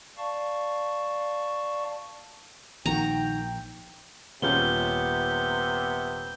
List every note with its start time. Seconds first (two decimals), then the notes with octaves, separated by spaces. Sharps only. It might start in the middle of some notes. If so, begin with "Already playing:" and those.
0.18 D5 F5 A5 C#6
2.86 A#1 D#3 F#4 G5 A#5
4.42 D#1 C3 B3 C#4 F4 G6 G7